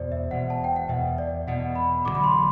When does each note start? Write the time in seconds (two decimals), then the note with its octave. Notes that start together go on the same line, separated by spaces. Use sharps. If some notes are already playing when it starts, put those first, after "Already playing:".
Already playing: E1 E2 B2 C5 D5
0.12 E5
0.31 E1 E2 B2 F#5
0.50 A5
0.64 G5
0.76 F#5
0.89 E1 E2 B2 E5
1.18 D5
1.47 E1 E2 B2 F#5
1.75 B5
2.05 A1 G2 D3 F#3 D6
2.15 B5
2.24 C6